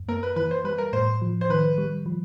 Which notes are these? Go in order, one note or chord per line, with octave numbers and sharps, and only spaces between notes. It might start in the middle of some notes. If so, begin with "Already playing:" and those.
Already playing: F#2
A#3 A#4
B4
E3 B4
C5
G3 B4
A#4
A2 C5
F3
C5
D#3 B4
G3
F3